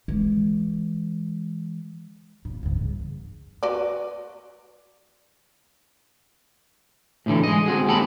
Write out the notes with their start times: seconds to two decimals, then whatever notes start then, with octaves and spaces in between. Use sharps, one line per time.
0.08 E3 G#3
2.45 A#2
2.63 C#2 G2
2.76 E2
3.63 F#4 B4 D5
7.26 A2 D3 E3
7.44 G#3 D#5
7.66 C4 F#4 G#4
7.87 D#2 G#3 G4 A4 A5 B5